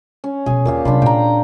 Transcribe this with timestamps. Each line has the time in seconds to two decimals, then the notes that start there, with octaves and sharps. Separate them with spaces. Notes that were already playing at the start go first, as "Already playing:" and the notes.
0.24 C#4
0.46 B2 F3 G#4 G#5
0.65 D#2 A#2 G4 F5
0.85 C3 F#3 D4 B5 C6
1.02 A#2 D4 G5 A#5